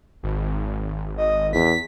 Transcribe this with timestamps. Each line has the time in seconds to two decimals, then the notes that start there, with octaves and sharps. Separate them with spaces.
0.23 G#1
1.17 D#5
1.53 E2 B6